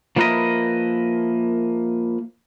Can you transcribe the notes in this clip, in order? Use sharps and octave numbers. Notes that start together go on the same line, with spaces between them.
F3 A#3 E4 A#4 B4 D#5